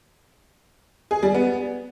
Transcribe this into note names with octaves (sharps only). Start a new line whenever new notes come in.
G#4
G3
B3